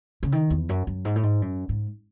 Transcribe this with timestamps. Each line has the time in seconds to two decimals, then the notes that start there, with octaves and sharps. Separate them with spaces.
0.23 C#3
0.32 D#3
0.50 E2
0.69 F#2
0.87 F#2
1.05 G#2
1.16 A2
1.23 G#2
1.42 F#2
1.69 G#2